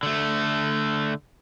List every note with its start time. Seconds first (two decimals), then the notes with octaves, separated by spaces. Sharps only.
0.03 D3 A3